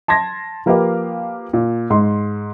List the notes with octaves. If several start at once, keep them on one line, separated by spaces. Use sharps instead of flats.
A5 C6 G#6 A#6
F3 A#3 G4 B4 F5
A#2
G#2 C6